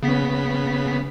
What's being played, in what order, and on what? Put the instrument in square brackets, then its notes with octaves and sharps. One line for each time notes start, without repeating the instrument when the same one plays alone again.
[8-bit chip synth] C#3 B3 B6